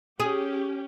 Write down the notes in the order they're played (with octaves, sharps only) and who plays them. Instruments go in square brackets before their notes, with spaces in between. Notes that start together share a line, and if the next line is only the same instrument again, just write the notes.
[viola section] C#4 G4 [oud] G#4